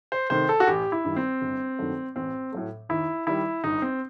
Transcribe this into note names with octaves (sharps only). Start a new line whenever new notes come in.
C5
C3 D#3 A3 C5
A4
F#4
A1 G4
E4
G2 D#3 G3
C4
G1
G2 D#3 F#3 A3
A1 C4
A2 F#3 A3
D#2 E4
D#3 G3 E4
G1 D#4
C4